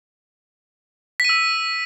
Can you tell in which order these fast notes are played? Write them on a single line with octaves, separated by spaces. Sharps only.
B6 D#7 E6